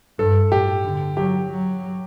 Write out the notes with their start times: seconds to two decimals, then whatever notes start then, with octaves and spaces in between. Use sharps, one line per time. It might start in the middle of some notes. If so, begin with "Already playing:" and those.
0.19 G2 A4
0.51 A2 G4
0.85 D3
1.17 F#3 G4
1.49 F#3